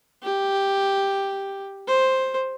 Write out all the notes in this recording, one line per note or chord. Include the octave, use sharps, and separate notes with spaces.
G4
C5